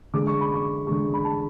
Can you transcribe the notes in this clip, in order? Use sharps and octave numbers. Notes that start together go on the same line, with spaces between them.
D3 G#3 D6
C#6
B5
C#6
D3 G#3 C#6
B5
A5